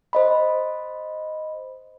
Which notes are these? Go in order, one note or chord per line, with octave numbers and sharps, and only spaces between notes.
C5 D#5 B5